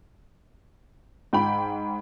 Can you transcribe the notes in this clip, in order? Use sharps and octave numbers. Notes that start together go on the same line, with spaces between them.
G#2 G5 B5